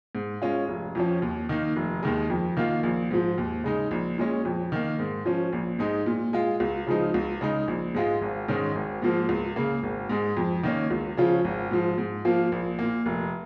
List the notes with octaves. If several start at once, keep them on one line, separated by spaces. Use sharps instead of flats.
G#2
G#3 C#4 F4
F1
F2 F3 C#4
D#2
D#3 A#3 D#4
F1
D#2 D#3 G#3
F2
D#3 A#3 F4
A#1
G#2 F3
D#2
C#3 G#3 D#4
A#1
A#2 G#3 C#4
F2
D#3 A#3
G#2
F3 C#4
A#1
G#2 G#3 D#4
A#2
G#3 F4
C#2
C#3 F3 G#3 D#4
C#2
C#3 G#3 D#4
A#1
G#2 G#3 F4
G#1
G#2 D#3 G#3 C#4
G#1
G#2 F3 A#3
C#2
C#3 A#3
G#1
G#2 G#3
F2
D#3 A#3 C#4
C#2
C#3 F3 C#4 F4
G#1
G#2 F3
G#2
F3 A#3 F4
A#1
A#2 A#3
F1